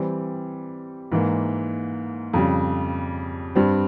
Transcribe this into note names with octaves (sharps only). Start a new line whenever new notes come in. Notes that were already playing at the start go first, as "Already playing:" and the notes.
Already playing: E3 G3 C4
G#2 E3 A#3
F2 C#3 G3
G2 G3 C4